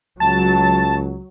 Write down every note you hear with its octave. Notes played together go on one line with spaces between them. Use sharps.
C#2 F#3 A5